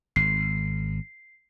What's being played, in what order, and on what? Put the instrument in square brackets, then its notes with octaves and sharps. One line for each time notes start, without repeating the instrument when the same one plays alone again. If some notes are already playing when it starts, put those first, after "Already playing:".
[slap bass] G#1 [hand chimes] C7